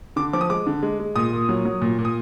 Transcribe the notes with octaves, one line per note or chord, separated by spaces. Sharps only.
D3 D6
F3 D6
D#6
G#3 D6
D3
G#3
G#3
A#2 D#6
A#2
F#3
F#3
A#2
A#2
D#6